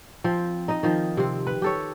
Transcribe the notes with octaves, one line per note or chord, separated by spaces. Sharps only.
F3 C4
D#4 D#5
D#3 F3
C3 C4
B4
G4 A4 C#5